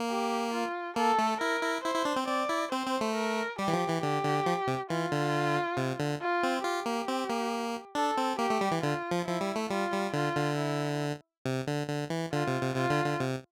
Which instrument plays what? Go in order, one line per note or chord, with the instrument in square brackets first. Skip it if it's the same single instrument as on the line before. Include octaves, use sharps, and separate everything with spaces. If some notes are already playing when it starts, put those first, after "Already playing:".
Already playing: [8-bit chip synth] A#3
[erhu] G4
F4
[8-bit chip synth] A#3 [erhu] A4
[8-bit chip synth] A3
[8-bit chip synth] E4 [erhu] A#4
[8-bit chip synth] E4
[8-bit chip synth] E4 [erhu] C5
[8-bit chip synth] E4
D4
C4
[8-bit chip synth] C4 [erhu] D5
[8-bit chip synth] E4
[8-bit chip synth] C4 [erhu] C5
[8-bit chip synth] C4
A3
[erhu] A#4
[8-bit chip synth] G3 [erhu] G4
[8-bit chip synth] E3
F3
E3
[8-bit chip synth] D3 [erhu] G4
[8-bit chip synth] D3
F3
C3
[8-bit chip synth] E3 [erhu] F4
[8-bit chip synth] D3
C3
D3
[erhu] F4
[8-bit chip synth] C4
[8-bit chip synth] F4 [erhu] G4
[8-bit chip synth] A#3
C4
A#3
[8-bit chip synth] D4 [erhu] A4
[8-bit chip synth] C4
[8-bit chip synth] A#3 [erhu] G4
[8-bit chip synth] A3
G3
E3
[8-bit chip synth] D3 [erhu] F4
[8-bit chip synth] F3
[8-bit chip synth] F3 [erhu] E4
[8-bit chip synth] G3
A3
[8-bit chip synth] G3 [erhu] F4
[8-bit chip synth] G3
[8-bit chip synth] D3 [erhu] F4
[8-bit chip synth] D3
[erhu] E4
[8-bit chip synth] C3
D3
D3
E3
[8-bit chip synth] D3 [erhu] F4
[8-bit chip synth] C3
C3
[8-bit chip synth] C3 [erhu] F4
[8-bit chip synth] D3
D3
C3